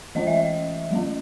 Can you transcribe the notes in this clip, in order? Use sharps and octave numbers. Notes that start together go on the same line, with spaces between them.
E3 A3 C#4 D#5
E5
D#5
F#3 A3 C#4